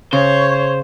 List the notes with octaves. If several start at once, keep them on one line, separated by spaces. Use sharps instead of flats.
C#3 C5 C#5